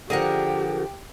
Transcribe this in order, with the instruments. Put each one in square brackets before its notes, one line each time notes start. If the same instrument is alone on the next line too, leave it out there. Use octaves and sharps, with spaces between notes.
[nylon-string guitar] D3 F3 [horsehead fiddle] G4 [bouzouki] G#4 A#4 F#5